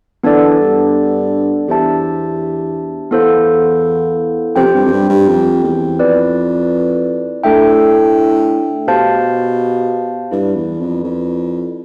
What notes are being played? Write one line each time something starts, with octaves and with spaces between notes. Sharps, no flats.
E3 B3 D4 A4 D5
G2
E2 D4 G4 C5 E5 A5
E2 B3 E4 A4 C5 F5
F2 C4 G4 C5 G5
F2
G2
F2
G2
G2
F2
E2
F2 E4 B4 D5
A2 A3 D4 A4 E5 G5
B2 G4 C5 F5 A5
G2 E4 B4 D5
E2
F2
F2